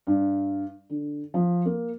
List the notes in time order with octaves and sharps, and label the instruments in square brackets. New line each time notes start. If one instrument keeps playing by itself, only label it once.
[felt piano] G2
D3
F3
A#3